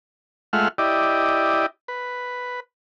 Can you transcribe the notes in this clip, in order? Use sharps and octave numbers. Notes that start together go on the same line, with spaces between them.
G#3 A3 F4 E5 F#5 F6
E4 G4 D5 D#5
B4